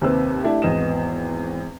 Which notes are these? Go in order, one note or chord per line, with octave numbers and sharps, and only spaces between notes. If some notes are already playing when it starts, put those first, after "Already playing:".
D#2 C3 C4 B4 E6
A3 D4 E4 G4
G#1 E2 B3 D#5 E7